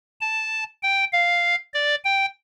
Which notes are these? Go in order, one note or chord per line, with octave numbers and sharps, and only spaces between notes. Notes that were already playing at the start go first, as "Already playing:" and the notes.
A5
G5
F5
D5
G5